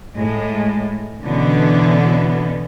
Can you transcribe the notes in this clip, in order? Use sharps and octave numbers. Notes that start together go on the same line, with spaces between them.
A2 G#3
B2 D3 E3 B3 C#4